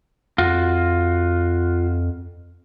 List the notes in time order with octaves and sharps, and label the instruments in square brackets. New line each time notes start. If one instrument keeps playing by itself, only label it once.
[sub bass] F2 [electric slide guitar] F4 F#4